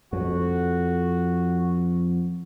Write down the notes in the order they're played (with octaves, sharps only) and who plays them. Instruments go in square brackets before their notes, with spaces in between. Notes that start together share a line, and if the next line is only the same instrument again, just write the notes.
[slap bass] F2 [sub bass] F3 [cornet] F#4